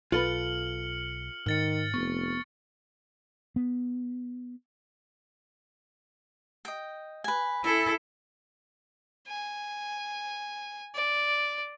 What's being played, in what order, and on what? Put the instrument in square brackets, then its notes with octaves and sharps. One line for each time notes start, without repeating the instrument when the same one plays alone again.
[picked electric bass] B1 [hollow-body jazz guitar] F4 A4 B4 [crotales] F6 C#7 F#7
[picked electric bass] G#2 [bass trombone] D#3 [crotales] F6 A6 C#7
[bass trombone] F1 [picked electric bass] B3 [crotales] C#6
[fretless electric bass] B3
[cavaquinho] D#5 G5
B4 G#5
[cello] E4 A4 [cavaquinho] G#5
[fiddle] G#5
D5